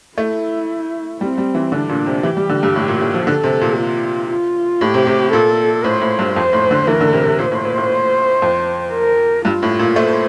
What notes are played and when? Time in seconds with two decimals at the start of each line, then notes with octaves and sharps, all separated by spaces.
0.18 A3 E4
1.21 G3 C4
1.38 G3
1.55 E3
1.72 D3 D4
1.89 A#2
2.06 C3
2.23 E3 G4
2.37 G3
2.49 D3
2.63 G2
2.76 A2
2.88 A#2
3.01 A2
3.14 F3
3.26 D3 A4
3.44 C3
3.61 A#2
3.79 F4
4.30 F4
4.81 A2 G4
4.94 C3
5.07 C3
5.32 A#2 A4
5.84 A2 C5
6.01 A2
6.19 G2
6.36 F2 C5
6.53 A2
6.71 D3
6.87 E3 A#4
7.01 D3
7.13 C3
7.26 C3
7.39 A#2 C5
7.51 A2
7.65 A#2
7.77 A2
8.42 F2
8.94 A#4
9.45 G2 F4
9.63 A2
9.79 A#2
9.96 A3 C5